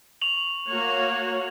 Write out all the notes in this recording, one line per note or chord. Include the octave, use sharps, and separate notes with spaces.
C#6 F7 F#7
A#3 F#4 C#5